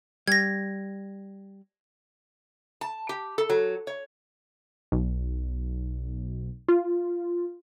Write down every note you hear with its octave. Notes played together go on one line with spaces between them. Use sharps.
G3 G#6 A#6
A5
G4
A4
F#3
C#5
B1
F4